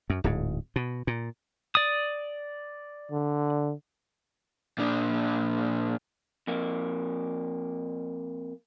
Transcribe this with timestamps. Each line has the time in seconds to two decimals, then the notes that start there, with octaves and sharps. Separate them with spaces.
0.10 F#2
0.24 D1 G#2
0.76 B2
1.07 A#2
1.75 D5 D#6
3.12 D3
4.78 A#2 D4
6.47 F2 A#3